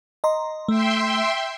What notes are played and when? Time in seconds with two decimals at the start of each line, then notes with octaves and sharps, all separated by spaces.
0.24 D#5 A#5 C6
0.68 A3 E5 G5 C6